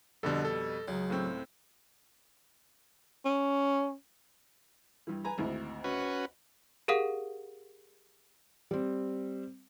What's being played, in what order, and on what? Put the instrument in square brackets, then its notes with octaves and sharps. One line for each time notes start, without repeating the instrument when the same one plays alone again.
[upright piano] F2 B2 G3 [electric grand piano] D3 A4
[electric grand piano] A4
[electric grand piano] C#2 [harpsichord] C#3 F#3
[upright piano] A2 C4
[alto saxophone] C#4
[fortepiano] G2 E3
B4 G#5 A#5
G#1 D2 E4
[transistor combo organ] C#4 F#4 B4
[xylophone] G4 G#4 A#4 F5 F#5 D#6
[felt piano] G3 C4